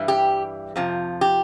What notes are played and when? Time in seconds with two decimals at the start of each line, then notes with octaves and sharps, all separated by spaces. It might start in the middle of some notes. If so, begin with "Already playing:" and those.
Already playing: G2 E3 G3
0.08 G4
0.76 F2 C3 F3
1.21 G4